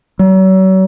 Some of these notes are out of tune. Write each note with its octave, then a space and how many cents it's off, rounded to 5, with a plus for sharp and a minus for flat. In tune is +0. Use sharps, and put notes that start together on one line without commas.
F#3 +40